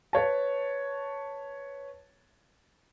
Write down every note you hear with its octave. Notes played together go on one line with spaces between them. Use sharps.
B4 C#5 A5